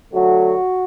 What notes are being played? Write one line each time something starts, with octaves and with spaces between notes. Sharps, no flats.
D3 F#3 A3 F#4